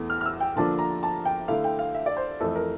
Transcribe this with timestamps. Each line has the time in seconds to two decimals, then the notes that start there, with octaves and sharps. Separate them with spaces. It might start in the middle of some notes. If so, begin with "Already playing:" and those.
Already playing: E2 E3 A3
0.10 F6
0.21 F6
0.26 E6
0.41 G5
0.56 D3 F3 A#3 D4 F4 A5
0.79 A#5
1.03 A5
1.25 G5
1.48 D3 A3 E4 F5
1.64 G5
1.79 F5
1.95 E5
2.06 D5
2.17 C5
2.40 F2 E3 A3 A4
2.55 A#4